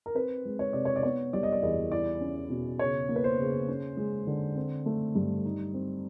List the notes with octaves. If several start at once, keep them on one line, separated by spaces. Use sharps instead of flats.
A#4
C4 B4
G#3
C#5
C3 D5
C#5
D5
B3 C#5
G3 D5
D#5
D5
E2 D#5
E4 D5
C#4
B2
C#3 C#5
A#3
B4
C5
C#3
C#4
G#3
D3
C4
A3
G2
D#4
C4